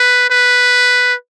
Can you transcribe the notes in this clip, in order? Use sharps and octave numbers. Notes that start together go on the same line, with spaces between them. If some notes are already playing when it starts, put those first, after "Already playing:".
Already playing: B4
B4